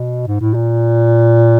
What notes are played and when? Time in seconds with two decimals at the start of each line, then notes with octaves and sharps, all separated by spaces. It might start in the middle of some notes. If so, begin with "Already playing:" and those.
Already playing: B2
0.27 G#2
0.40 A2
0.54 A#2